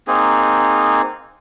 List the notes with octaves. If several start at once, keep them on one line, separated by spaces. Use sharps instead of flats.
A#3 C4 D#4 G#4